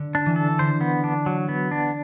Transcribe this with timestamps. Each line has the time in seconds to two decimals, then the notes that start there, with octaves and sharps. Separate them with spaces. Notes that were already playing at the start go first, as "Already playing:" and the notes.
Already playing: D3
0.15 D4
0.26 E3
0.36 A4
0.59 D3 C5
0.81 B3
1.04 D4
1.26 F#3
1.49 B3
1.71 D4